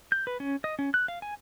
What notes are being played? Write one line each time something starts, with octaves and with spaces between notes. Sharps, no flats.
G6
B4
C#4
D#5
C#4
F#6
F5
G#5